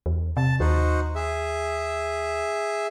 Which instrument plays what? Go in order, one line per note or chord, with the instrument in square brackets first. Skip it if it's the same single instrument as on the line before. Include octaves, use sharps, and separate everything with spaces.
[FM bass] E2
[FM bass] C3 [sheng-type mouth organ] A5
[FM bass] D#2 [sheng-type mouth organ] D#4 F#4 C5
[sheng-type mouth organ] G#4 E5